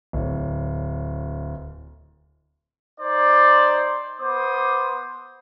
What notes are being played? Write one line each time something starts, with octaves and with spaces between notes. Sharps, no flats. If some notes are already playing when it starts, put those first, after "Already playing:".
D1
D#4 C5 D5
B3 C5 D6 D#6